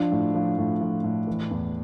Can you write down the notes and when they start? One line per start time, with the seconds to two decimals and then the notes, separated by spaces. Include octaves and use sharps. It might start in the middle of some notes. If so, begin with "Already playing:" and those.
Already playing: F3 D4
0.11 A2
0.35 F3
0.58 A2
0.81 F3
1.04 A2
1.27 E3
1.51 E2